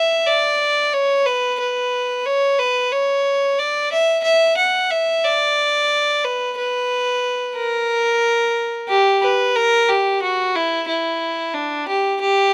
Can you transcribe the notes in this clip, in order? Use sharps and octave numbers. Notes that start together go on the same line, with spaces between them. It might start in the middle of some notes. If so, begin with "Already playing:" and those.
Already playing: E5
D5
C#5
B4
B4
C#5
B4
C#5
D5
E5
E5
F#5
E5
D5
B4
B4
A#4
G4
B4
A#4
G4
F#4
E4
E4
D4
G4
G4